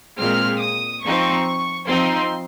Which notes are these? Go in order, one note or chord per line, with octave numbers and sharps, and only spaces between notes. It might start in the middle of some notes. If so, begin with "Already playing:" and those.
A#2 G#3 C4 F6
D#6
F3 C4 D#4 C#6
F3 C4 D#4 C6